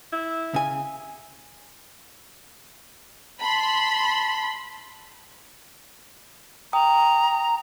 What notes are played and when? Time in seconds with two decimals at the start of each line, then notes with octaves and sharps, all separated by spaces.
0.13 E4
0.54 C#3 G#5
3.41 A5 B5 C6
6.73 G5 A#5 D#6